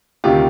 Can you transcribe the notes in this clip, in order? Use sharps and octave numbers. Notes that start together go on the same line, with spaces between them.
D2 C3 D#3 F4 G4